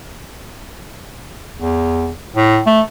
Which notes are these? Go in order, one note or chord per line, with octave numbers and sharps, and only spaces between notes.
E2
A2
A3